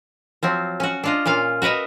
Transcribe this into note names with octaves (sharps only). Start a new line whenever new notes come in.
F3 F#3 C4
C#4 F#4
D4 F4 D#5
A#2 C#4 F4 F5
F#4 A#4 B4 D#5 E5